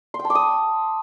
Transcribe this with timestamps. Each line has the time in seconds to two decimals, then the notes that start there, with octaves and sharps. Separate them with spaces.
0.14 C6
0.19 G5
0.25 A5
0.30 D6
0.35 D#6